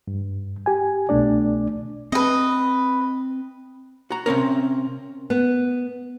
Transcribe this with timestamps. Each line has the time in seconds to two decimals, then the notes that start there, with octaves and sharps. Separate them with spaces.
0.08 G2
0.66 G4 G#5
1.09 C2 B2 A3 D4 D5
2.12 C4 B4 D#5
4.10 F#4 A#5
4.26 C3 C4 C#4 A#4
5.30 B3